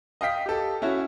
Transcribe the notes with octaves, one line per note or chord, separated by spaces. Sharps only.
D#5 F5 G5 B6
G4 A4
C#4 E4 F#4